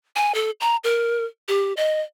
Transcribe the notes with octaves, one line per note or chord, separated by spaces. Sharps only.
G#5
A4
A#5
A#4
G4
D#5